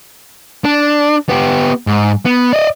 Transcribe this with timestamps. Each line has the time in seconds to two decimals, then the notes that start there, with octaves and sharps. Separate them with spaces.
0.64 D4
1.29 B3 G4
1.87 G#2
2.25 B3
2.53 D5 D#5